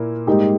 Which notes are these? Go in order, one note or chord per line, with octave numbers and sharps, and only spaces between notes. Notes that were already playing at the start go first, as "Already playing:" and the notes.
Already playing: A#2 A#3 E4
G#2 G3 A#3 D#4 G4